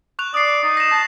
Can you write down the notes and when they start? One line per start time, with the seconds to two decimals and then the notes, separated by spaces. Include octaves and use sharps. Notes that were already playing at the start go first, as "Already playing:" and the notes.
0.19 C#6 F#6 F7
0.34 D5 D#6 C7
0.64 D#4
0.77 A#6 E7
0.91 A5